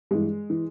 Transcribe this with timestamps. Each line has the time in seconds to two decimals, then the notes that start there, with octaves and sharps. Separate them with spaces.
0.11 G2 E3 G#3
0.50 E3